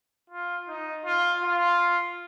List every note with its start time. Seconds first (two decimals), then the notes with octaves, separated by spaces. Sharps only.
0.30 F4
0.68 D#4
1.05 F4
1.43 F4